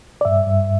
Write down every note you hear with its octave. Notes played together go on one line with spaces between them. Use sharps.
D5
G2 E5
G2